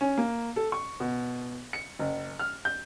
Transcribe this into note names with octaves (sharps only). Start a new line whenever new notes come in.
C#4
A#3
A4
C#6
B2
C#7
F#1
F6
G6